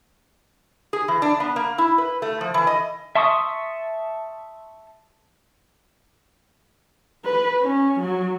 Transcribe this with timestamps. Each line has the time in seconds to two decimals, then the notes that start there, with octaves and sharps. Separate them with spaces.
0.93 G#4
1.08 E3
1.22 D4
1.40 B3
1.56 A#3
1.78 E4
1.98 B4
2.22 A3
2.41 F3
2.54 E3
2.67 D#5
3.15 E5 A5 C6 C#6 D#6
7.24 B4
7.61 C#4
8.00 F#3